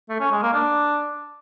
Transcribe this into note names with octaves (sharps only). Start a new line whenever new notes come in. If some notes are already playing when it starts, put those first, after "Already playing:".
A3
C#4
G#3
A#3
D4